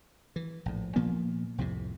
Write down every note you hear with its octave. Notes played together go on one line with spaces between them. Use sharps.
E3
A#1 A2
A#2 F3 A#3 B3
C2 F2 A2 C3